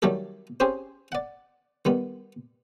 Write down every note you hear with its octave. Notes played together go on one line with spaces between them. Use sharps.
D#3 F#3 G3 E4 G4 A4
C4 C#4 G4 G#4 C5
D5 F#5
D#3 G3 B3